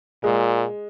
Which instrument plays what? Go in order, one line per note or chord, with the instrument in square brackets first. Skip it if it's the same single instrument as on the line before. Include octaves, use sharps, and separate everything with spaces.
[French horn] A#2 [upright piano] G#3